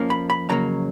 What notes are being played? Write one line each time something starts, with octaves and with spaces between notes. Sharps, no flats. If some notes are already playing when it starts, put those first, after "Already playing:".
Already playing: F2 F3 A#3 C#4
B5
B5
F2 C#3 F#3 A#3 A#5